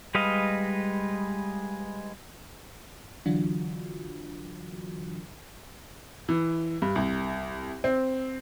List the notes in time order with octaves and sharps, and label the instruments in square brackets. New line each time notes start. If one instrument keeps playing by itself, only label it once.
[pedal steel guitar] G3 G#3 B4 D#5 F5
[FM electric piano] D3 E3 F#3 D4 F4 F#4
[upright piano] E3
G2
C2
C4